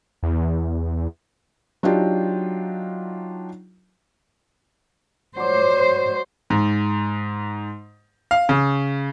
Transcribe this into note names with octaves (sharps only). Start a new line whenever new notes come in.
E2
F#3 D4 D#4 F4 G4
F#3 C5 D5
G#2
F5
C#3